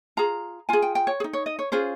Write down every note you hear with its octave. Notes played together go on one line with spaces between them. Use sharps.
F4 G#4 A#5
F4 G#4 G#5
G5
G5
C#5
G#4
D#4
C#5
D#5
C#5
C#4 F4 G#4 C5